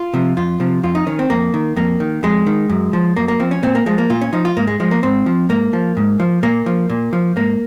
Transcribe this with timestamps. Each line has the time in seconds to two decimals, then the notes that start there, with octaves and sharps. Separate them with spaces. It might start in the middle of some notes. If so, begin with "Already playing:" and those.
Already playing: F4
0.14 C3 F3
0.37 F2 F4
0.60 C3 F3
0.83 F2 F4
0.95 D#4
1.07 D#3 C#4
1.19 C4
1.30 F2 A#3
1.54 D#3
1.76 F2 A#3
2.00 D#3
2.23 F2 G#3
2.46 D#3
2.69 F#2
2.93 F3
3.16 F#2 A#3
3.28 A#3
3.40 F3 C4
3.51 C#4
3.63 A#2 C4
3.75 A#3
3.86 F3 G#3
3.98 A#3
4.10 A#2 F4
4.21 C#4
4.33 F3 D#4
4.45 F4
4.57 G#2 A#3
4.67 G#3
4.80 F3 G#3
4.91 A#3
5.03 G#2 C4
5.26 F3
5.49 G#2 A#3
5.73 F3
5.97 G#2
6.20 F3
6.43 A#2 A#3
6.66 F3
6.90 A#2
7.13 F3
7.36 G#2 A#3